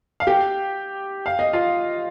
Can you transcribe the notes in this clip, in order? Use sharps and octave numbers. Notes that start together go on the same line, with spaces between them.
F5
G4 G5
F5
D#5
F4 F5